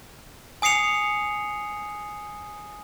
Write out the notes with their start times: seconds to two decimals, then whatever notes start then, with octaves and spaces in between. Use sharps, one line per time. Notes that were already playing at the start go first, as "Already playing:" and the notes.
0.62 G#5 D#6 C7 C#7 F7